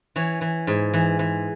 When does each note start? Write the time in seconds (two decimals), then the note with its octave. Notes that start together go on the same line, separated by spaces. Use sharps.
0.16 E3 C#5
0.41 E3
0.67 G#2
0.94 E3
1.19 E3